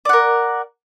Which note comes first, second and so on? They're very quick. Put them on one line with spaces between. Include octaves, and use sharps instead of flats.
D5 F#5 A#4